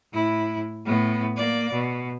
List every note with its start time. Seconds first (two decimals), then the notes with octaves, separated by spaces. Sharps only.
0.13 A2 E4
0.85 A2 B3
1.37 A#3 D5
1.73 B2